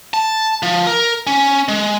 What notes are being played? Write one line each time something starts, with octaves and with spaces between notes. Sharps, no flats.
A5
F3
A#4
C#4
G#3